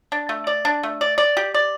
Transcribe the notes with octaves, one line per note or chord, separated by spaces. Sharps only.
D4
A3
D5
D4
A3
D5
D5
G4
D5